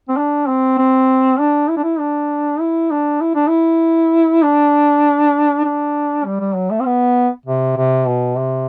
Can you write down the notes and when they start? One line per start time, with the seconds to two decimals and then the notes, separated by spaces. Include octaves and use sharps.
0.09 C4
0.17 D4
0.47 C4
0.78 C4
1.39 D4
1.69 E4
1.77 D4
1.83 E4
1.99 D4
2.60 E4
2.91 D4
3.21 E4
3.35 D4
3.48 E4
4.43 D4
5.64 D4
6.25 G3
6.40 G3
6.55 F#3
6.71 A3
6.80 C4
6.86 B3
7.46 C3
7.77 C3
8.07 B2
8.37 C3